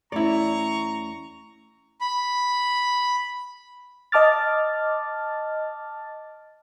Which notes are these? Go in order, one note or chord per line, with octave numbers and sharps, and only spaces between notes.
E2 A3 C#4 E4 D5 A#5 C#6
B5
D#5 A5 D6 F6 A6